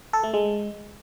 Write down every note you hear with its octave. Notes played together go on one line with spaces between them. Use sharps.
A4
A3
G#3